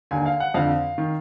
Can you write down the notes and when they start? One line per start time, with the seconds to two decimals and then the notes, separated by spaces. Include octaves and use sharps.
0.11 D#2 D3 G#5
0.26 F5
0.40 F#5
0.54 F2 D3 F5
0.98 D#3